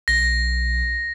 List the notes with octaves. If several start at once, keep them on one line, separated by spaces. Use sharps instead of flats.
B1 A#6